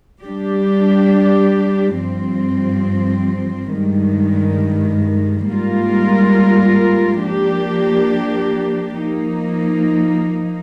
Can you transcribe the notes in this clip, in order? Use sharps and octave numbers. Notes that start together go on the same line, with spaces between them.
G3 D4 G4
G2 F3 C4
G2 D#3 G#3
G#2 G3 A#3 F4 A#4
F3 A#3 D4 G4
F3 A#3 D#4